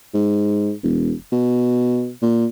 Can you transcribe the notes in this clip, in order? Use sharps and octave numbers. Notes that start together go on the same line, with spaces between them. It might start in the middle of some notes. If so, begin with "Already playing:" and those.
G#2
E1
B2
A#2